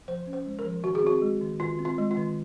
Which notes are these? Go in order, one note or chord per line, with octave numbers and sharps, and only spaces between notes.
F3 C5
C#4
C5
G#3
A#4
F3
D#3 F#4
G#4
C4 F#4
G#3
D#3
D#3 F4
C4
F4
G#3
F4
D#3